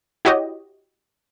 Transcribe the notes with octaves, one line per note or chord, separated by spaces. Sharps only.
E4 F#4 G4 C#5 D#5